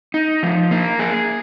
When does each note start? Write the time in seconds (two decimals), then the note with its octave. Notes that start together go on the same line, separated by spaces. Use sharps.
0.14 D#4
0.43 F3
0.71 A#3
0.99 G#4